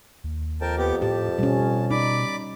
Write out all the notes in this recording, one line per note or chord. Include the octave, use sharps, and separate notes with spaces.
D#2
F2 A#4 G5 A5
B3 G4
A2 G4 A5
B2 G3 C#4
D#4 D5 B5 D6